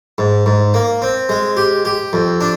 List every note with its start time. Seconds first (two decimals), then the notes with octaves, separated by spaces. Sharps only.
0.18 G#2
0.46 G#2
0.74 A#3
1.02 C4
1.29 G#3
1.57 G4
1.85 G4
2.13 F2
2.41 D4